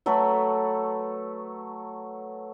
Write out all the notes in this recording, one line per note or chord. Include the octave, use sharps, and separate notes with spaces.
F#3 A3 A4 B4